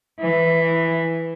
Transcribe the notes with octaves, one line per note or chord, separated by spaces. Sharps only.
E3